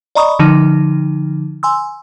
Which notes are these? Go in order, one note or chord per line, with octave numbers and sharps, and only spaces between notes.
D5 D#5 A#5 B5 C#6 D#6
D3 F3 D#4
G#5 C6 E6